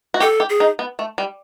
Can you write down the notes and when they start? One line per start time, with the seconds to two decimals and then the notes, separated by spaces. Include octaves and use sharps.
0.14 F#4
0.20 G4 A4
0.40 G4
0.49 G#4
0.60 D#4
0.79 B3
0.99 A3
1.18 G3